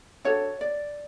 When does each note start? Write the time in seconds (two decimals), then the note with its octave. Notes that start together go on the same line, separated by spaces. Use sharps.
0.25 D4 F#4 A4 C#5
0.61 D5